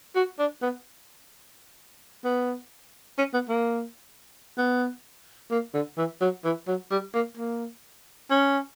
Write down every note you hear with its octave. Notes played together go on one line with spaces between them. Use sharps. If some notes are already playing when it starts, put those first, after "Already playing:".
F#4
D4
B3
B3
C#4
B3
A#3
B3
A#3
D3
E3
F#3
E3
F#3
G3
A#3
A#3
C#4